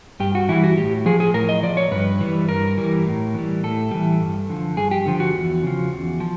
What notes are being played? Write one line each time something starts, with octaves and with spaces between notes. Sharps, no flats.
G2 G4
F#4
E3 G3 E4
F#4
A2 G4
F3 G#4
G#4
A2 A#4
D#5
F3 D5
C#5
G2 B4
E3 G3
G2 A#4
E3 G3
A2
E3 G3
A2 A4
E3 G3
G2
D3 F3
G2 G#4
G4
D3 F3
F#4
E2
C#3 F3
E2
F3